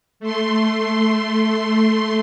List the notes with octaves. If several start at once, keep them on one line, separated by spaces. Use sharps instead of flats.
A3 C6